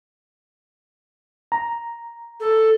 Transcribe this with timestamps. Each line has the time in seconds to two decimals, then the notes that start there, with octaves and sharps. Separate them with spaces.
1.52 A#5
2.40 A4